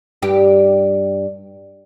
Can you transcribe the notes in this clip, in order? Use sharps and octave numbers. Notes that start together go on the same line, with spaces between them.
G2 G4